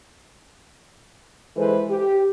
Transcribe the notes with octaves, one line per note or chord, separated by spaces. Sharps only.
E3 G#3 G#4 A4 B4 C5
G4